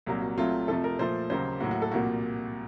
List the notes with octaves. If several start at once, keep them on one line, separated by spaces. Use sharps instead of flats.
C2 A#2 F#3 A#3
F#4
C2 C3 F#3 A3 F4
F2 C3 F3 A3 A4
A#4
A#2 F3 A3 C5
D#2 C#3 F#3 A#3 C5
A2 F#3 A#3 F#4
F#4
A4
C2 A#2 F3 A#3 F#4